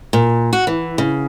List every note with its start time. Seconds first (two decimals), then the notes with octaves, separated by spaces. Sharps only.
0.13 A#2
0.53 F#4
0.67 E3
0.98 C#3